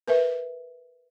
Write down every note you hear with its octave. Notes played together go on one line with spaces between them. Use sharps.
A#4 B4 E5